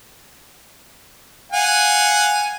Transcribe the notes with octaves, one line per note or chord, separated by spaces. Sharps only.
F5 F#5 G#5